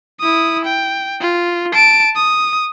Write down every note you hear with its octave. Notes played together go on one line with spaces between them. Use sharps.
E4 D#6
G5
F4
A5 D7
D#6